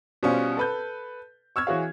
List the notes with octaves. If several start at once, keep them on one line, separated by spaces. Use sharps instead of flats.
B2 G3 C#4 F4 C5
A4 B4 G6
C#6 E6 F6 G#6
E3 F#4 G#4 C#5 F5